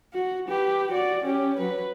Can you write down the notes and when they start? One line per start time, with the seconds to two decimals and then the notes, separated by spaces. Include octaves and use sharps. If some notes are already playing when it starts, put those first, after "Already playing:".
0.14 F#4
0.48 G4 B4
0.92 F#4 D5
1.24 C#4 G4
1.58 F#3 B4